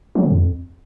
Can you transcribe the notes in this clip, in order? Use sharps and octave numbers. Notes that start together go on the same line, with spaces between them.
F#3
D3
F2